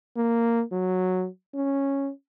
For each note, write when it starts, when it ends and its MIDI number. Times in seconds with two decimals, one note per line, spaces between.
0.17 0.62 58
0.72 1.27 54
1.54 2.10 61